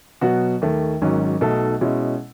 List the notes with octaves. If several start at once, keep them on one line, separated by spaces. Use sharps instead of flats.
B2 F#3 B3 F#4
D#2 D#3 A3
G#1 G#2 D#3 F#3 C#4
B1 B2 A3 D#4 A4
B2 G#3 C#4 E4